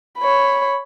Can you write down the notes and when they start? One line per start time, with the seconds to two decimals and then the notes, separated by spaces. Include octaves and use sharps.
0.19 C#5 B5